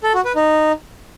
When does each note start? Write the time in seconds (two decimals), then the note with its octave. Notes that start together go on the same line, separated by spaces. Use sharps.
0.04 A4
0.14 F#4
0.25 B4
0.36 D#4